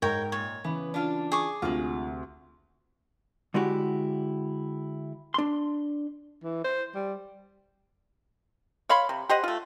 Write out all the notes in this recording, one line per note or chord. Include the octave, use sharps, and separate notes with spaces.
G#2 A#4 C#5 G5
A#2 C#5
C#3 E3 B3
D4 F4
G#4 C#6 D6
D2 C3 G#3 F4
D3 G#3 E4 F#4 G4
D4 C6
E3
C5
G3
C#5 F5 B5 C6
C3
G4 C5 D#5 F#5
A3 F4